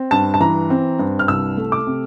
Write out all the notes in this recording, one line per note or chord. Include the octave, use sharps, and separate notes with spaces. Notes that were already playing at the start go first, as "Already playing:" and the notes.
Already playing: C4
G2 A5
A5
E3 A#5
C4
G2
F6
C2 E6
A3
D6
C3